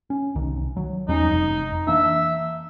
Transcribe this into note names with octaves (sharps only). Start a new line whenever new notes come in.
C#4
C2 D#3
F#3
E2 G3 C#4 D#4
F1
E3 A#3 D4 E5